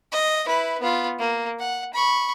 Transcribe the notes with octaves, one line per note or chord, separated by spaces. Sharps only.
D#5
E4 B4
B3 F4
A#3
F#5
B5 C#6